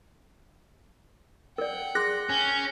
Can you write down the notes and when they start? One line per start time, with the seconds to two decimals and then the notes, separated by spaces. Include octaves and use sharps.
1.58 A#4 D5 F#5 G5
1.95 G#4 C6 F#6 A#6
2.29 C#4 G6